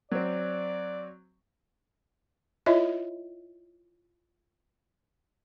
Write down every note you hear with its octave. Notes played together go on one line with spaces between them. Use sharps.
F#3 C4 D5
E4 F4 C#5 D#5 E5